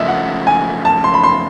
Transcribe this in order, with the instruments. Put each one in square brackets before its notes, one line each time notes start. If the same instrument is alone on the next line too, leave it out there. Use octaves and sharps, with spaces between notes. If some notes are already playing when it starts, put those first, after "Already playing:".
Already playing: [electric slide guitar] C#3 F3 A3 [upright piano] D#5 E5
[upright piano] F#5
G#5
A5
C6
B5
C6